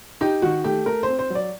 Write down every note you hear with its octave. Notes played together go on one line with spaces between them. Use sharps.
D#4 G4
D#3 F#4
A3 G4
A3 A#4
C5
C4
C5
F#3
D5